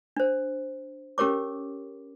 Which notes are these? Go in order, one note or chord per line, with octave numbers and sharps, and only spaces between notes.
D4 C5
C#4 G4 A#4 C#5 D6